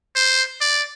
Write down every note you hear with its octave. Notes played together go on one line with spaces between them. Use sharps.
C5
D5